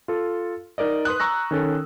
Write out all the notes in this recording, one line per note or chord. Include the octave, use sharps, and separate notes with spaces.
F4 A4
D#4 A#4 D5 D#5
B4 C6 D#6 F#6
A#5 C#6 E6 A#6
D#3 C#4 A4